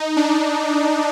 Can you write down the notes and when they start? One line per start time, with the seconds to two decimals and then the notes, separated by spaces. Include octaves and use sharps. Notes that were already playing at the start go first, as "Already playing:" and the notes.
Already playing: D#4
0.17 D4